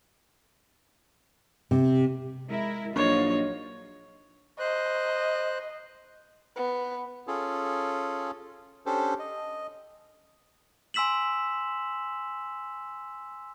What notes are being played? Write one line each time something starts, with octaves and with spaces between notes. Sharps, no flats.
C3
G#3 E4 A#4
A#1 F#3 D#4 F4 C#5
C5 D#5 F#6
B3
C#4 F4 G#4 A4
C#4 D4 G4 A4 C5
D#5
G#5 C6 E6 B6 E7 F#7